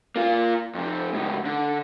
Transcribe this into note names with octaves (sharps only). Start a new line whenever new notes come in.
A#3 F4
F2 C3
C#2 A2
D3